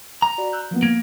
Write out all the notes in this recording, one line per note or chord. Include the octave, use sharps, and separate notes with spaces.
A#5
F#4 D5 B5
E6 F#6 G6
F3 A#3 B3
A#3 G#6